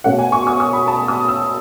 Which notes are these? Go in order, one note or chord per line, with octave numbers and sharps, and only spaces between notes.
B2 A3 C#4 F#5
G#5
C#6
D#6
D#6
B5
A5
D#6
E6